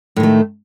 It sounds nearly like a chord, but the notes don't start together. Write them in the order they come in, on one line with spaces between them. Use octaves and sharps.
A2 D#3 A3